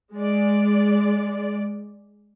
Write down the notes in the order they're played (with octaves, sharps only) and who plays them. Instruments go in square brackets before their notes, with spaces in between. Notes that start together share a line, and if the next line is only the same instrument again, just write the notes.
[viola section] G#3 D5